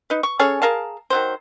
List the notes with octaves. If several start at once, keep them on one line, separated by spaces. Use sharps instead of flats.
D#4 B4
C#6
C#4 G#4 A4 C#5
G#4 A#4 F5 A5
D#3 F#3 C5